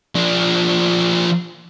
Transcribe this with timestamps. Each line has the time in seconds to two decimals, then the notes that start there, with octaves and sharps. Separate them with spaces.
0.15 F3 D4